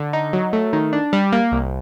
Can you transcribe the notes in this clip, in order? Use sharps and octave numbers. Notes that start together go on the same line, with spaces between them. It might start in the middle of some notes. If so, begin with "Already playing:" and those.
Already playing: D3
D#4
F#3
A3
D#3
D4
G3
A#3
C2